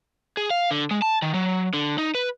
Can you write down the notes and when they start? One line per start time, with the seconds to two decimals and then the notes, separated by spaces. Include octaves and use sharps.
0.37 G#4
0.50 F5
0.71 D3
0.91 G#3
1.02 A5
1.22 D#3
1.34 F#3
1.74 D3
1.98 D#4
2.15 B4